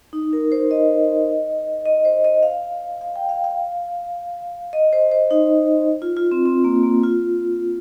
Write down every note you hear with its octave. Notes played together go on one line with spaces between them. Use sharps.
D#4
A#4
C5
D#5
D#5
C5
D#5
F5
F5
G5
F5
F5
D#5
C5
C5
D#4
F4
F4
C4
C4
A#3
A#3
F4